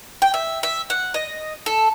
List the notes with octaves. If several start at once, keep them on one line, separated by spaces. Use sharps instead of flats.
G5
E5
E5
F#5
D#5
A4